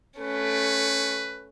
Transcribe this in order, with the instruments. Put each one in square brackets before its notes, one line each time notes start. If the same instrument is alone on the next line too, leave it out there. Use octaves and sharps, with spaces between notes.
[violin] A3 C#4 [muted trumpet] B4